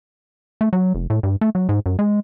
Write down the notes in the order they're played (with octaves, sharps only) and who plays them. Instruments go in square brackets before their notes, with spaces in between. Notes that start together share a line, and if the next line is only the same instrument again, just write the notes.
[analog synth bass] A3
F#3
F1
A2
G2
A3
F#3
G#2
F#2
G#3